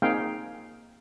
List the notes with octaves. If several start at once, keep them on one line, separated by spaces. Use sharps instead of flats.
A#3 C4 D#4 G#4 F5 G5